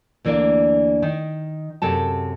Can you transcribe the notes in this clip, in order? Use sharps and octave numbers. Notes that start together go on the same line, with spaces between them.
D2 E3 A#3 D4 D5
D#3
F#2 C3 A4 A5